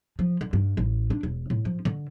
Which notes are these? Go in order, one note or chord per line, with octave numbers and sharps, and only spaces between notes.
F3
D3
G2
A1
D4
E1
A2
F3
D3